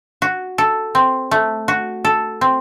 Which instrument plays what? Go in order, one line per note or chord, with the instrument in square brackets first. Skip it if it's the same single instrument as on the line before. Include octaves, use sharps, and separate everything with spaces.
[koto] F#4
A4
C4
A3
F#4
A4
C4